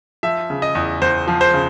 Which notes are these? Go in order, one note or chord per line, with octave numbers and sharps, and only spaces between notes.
F3 E5
C#3
D#5
E2
E2 C5
F3
C5
C#3